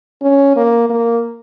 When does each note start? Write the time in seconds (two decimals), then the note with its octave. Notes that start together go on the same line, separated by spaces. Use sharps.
0.22 C#4
0.56 A#3
0.90 A#3